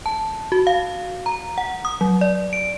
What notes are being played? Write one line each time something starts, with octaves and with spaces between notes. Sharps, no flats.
A5
F#4
F5
A#5
F#5
D#6
F#3
D5
D7